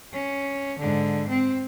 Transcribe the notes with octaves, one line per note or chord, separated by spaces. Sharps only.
C#4
G#2 D3
C4